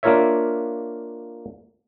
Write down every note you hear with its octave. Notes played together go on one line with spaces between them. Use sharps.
A#3 D4 F4 A#4 C#5 E5